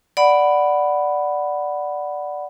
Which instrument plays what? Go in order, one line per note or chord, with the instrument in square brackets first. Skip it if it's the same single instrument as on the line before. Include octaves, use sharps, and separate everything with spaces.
[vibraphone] D5 F#5 B5